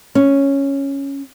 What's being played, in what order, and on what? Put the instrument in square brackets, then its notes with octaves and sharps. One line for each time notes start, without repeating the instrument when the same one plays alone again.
[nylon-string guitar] C#4